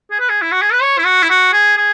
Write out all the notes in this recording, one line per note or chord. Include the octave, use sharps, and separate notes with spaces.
G#4
B4
G#4
E4
F#4
G#4
B4
C#5
E4
F#4
E4
F#4
G#4
G#4